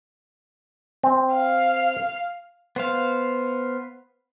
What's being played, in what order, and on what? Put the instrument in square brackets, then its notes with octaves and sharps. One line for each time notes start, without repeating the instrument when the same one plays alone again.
[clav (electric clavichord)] C4
[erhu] F5
[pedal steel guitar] B3 C5 F5